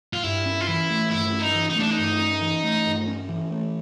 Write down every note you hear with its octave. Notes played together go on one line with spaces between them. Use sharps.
F4
G2 E4
C#4
F4
E3 E4
A3
G2 E4
C#4
D#4
E3
D#4
A3 D4
D#4
G2
C#4
E3
A3
G2
C#4
E3
A3